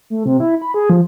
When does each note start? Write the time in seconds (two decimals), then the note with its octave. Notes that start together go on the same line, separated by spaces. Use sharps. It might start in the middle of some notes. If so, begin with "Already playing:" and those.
0.10 A3
0.26 C3
0.40 E4
0.62 B5
0.74 G#4
0.90 F3